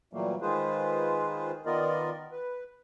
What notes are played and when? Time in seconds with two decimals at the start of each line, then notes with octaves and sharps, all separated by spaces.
0.13 A#2 E3 F#3 G3 A3 A#3
0.42 D#3 G#3 F4 G#4 B4 C5
1.66 D#3 B3 F4 A#4 D5 D#5
2.32 B4